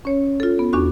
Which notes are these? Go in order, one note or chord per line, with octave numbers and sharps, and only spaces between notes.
C#4 C#5
F4 A4
B3
E2 D4 F#4 C#6